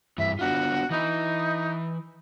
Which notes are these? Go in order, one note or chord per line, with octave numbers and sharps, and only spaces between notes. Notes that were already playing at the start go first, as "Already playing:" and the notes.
G2 E3 E5
B3 D4 F4 F#4
E3 D#4 E4